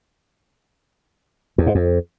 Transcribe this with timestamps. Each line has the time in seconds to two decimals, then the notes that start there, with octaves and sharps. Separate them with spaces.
1.58 E2
1.67 G#2
1.75 F2